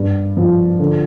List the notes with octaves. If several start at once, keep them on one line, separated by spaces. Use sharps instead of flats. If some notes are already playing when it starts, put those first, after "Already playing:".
Already playing: G2
F3
D3